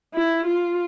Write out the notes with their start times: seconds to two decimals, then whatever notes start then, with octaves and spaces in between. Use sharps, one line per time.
0.14 E4
0.46 F4